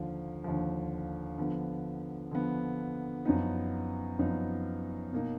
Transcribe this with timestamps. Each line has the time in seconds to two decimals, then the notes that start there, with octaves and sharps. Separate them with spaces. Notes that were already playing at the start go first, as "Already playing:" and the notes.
Already playing: D#2 D3 F3
0.44 D#2 D3 F3
1.38 D3 F3 B3
2.31 D3 F3 B3
3.25 F#2 F3 B3 D#4
4.19 F#2 F3 B3 D#4
5.12 B2 A#3 D#4